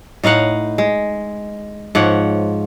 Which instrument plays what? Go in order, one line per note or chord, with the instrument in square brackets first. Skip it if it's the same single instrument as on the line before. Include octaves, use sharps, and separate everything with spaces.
[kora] A2 D#4 F5 F#5
G#3
G#2 F3 C#5 F#5